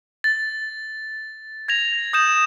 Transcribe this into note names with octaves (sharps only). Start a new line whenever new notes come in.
A6
G#6 A#6 F7
D#6 G6 E7